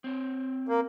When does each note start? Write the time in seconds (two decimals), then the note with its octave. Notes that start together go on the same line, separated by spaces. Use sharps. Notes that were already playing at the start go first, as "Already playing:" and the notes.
0.04 C4 C#5
0.69 A#3